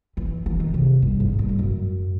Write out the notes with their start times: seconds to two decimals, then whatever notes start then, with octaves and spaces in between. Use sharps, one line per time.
0.17 E3
0.46 E3
0.60 D#3
0.74 C3
1.02 G2
1.20 G#2
1.39 G2
1.49 F2
1.59 F#2